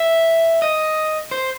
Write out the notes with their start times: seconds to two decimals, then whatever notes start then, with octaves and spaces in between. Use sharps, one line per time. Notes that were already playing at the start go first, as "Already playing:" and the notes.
Already playing: E5
0.62 D#5
1.31 C5